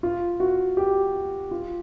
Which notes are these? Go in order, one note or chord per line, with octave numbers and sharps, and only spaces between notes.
F4
F#4
G4
F4